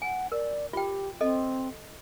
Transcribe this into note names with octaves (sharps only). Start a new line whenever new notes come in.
F#5 G#5
A#4 D5
F4 G4 G5
C4 A4 D#5